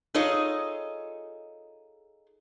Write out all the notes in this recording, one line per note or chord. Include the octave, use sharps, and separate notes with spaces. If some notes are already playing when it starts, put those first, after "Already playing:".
D#4 F4 G#4 A4 C#5 D#5